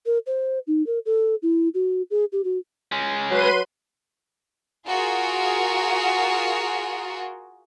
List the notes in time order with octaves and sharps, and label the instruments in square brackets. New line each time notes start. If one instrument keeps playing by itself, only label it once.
[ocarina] A#4
C5
D#4
A#4
A4
E4
F#4
G#4
G4
F#4
[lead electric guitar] G#3 C#4
[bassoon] F#3 [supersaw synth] B4 C6 D#7
[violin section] F4 F#4 G#4 A#4